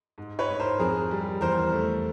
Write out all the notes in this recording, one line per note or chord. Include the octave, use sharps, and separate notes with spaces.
G#2
B4 C#5
G#2
A#4 C5
F2 G#4 A#4
G3
E2 A#4 C5
A3